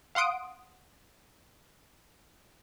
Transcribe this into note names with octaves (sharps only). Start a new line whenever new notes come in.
F5 F#5 C6 D#6 D7